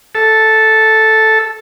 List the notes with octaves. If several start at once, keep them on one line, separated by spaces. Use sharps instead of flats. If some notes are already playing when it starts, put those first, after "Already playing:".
A4